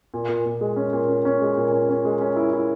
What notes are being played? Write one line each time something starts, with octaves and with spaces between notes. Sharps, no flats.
A#2
A#2
A#2
G#3
C#4
A#2
C#4
C#4
G#3
A#2
C#4
C#4
G#3
C#4
E4
E4